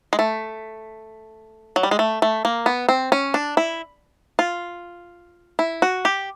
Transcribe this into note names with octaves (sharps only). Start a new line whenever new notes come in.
G#3
A3
F#3
G3
G#3
A3
A3
A#3
B3
C4
C#4
D4
E4
F4
E4
F#4
G4